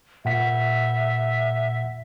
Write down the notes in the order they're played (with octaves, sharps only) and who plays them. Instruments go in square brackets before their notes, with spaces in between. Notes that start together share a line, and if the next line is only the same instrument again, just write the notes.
[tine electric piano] A#2 F#5 B6 [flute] E5